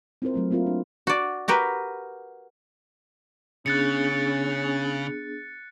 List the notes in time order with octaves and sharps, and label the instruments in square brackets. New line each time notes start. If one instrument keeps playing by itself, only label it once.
[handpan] C4 E4 F4 A#4 C5
F#3 A3 C4
A#3 C4 E4 F4 A#4
D4
[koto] F#4 D5
F#4 G4 A#4 B4
[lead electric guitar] C#3 [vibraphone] B3 D4 G#4 [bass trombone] C#4 [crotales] F#6 A6 C#7